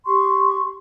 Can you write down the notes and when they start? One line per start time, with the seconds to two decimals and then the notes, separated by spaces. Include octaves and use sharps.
0.06 G4 C6 C#6